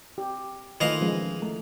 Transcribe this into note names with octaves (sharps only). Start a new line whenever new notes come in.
G4
D#3 E3 A3 F4 D#5 F5
F3 G#3 C#4
A3